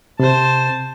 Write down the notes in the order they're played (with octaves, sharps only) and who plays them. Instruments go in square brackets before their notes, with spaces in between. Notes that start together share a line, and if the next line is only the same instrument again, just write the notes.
[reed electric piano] C3 [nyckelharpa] C5 A5